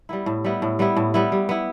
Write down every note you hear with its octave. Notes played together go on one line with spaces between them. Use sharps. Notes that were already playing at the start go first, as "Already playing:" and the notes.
G3 B3 E4
A2
G3 B3 E4
A2
G3 B3 E4
A2
G3 B3 E4
G3
B3 E4